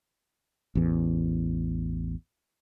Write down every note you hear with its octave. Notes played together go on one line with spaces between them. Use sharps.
A1 E2